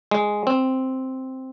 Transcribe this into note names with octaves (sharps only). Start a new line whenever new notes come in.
G#3
C4